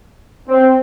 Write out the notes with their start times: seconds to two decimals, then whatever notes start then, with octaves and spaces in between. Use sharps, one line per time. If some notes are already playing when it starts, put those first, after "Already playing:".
0.49 C4